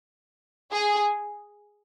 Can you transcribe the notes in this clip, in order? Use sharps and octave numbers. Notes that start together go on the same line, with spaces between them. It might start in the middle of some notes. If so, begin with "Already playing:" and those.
G#4